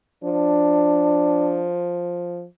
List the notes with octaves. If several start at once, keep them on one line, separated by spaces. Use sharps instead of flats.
F3 D4